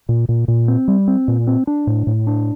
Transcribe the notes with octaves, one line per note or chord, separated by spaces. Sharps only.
A#2
A#2
A#2
C4
G3
C4
A#2
C4
D4
A2
A2
D4